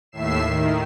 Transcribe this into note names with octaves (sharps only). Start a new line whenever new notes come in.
D#2 A2 E5 C7 E7
D#3